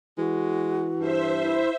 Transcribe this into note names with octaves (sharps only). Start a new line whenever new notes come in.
E3 G#3 F#4
G2 C5 E5
E4